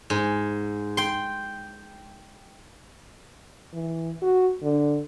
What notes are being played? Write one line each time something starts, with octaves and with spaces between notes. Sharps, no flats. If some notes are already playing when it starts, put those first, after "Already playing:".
G#2
G5 C6
E3
F#4
D3